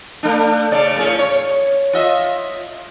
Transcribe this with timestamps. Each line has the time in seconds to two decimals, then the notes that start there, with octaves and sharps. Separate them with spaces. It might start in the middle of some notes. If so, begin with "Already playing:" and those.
0.23 A3 D4
0.72 C#3 D5
0.96 A2 C#4
1.19 C#5
1.93 F4 D#5 E5